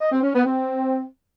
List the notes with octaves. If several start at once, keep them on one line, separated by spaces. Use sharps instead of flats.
D#5
C4
C#4
B3
C4